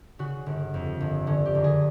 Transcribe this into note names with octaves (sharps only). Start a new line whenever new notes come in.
C#3 F#4
G1
F2
G1
D3 C#4
G4
F#1
G#4